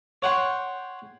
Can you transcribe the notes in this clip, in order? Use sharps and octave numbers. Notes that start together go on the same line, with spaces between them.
C#5 F#5 G5 C6